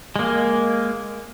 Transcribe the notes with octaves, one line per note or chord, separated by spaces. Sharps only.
G#3 A#3